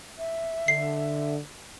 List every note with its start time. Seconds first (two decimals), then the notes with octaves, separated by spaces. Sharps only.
0.18 E5
0.68 D3 C7